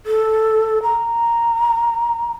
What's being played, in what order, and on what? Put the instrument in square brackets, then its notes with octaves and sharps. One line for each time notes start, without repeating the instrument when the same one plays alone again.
[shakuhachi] A4
A#5